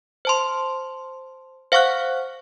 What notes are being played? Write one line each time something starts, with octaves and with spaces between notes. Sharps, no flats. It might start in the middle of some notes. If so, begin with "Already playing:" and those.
C5 A5 C6
C5 F5 F#5 C#6 F6 F#6